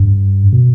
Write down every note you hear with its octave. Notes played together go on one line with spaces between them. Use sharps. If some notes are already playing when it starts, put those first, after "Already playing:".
Already playing: G2
B2